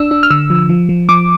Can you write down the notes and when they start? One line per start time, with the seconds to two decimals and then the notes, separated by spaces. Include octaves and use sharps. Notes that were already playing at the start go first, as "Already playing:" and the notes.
Already playing: D4 E6
0.11 D4
0.23 F6
0.30 D3 E6
0.50 F3
0.69 F3
0.89 F3
1.09 F3 D6